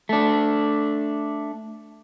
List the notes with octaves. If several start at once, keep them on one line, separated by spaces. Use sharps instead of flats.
A3 D4